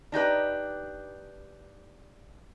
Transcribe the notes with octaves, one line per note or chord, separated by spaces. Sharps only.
D4 D#4 G4 B4